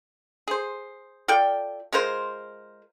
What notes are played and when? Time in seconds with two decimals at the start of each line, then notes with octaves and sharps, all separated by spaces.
0.48 G#4 C5
1.28 F4 A4 D5 G5
1.93 G#3 F4 A#4 C5